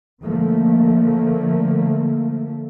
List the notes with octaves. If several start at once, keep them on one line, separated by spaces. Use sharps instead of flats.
D3 F3 A3 A#3